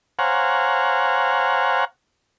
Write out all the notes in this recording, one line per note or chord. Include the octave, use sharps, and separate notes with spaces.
C5 C#5 F5 F#5 G#5 A#5